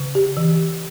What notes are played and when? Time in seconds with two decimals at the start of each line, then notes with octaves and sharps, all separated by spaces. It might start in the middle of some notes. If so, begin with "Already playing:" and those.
Already playing: C#3
0.15 G4
0.37 E3